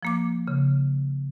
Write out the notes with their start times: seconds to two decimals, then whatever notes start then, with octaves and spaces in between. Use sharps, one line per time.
0.03 F3 A#3 D6
0.48 C#3